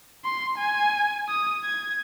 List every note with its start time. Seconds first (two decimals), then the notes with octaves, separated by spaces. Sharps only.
0.25 C6
0.58 G#5
1.28 D#6
1.64 G#6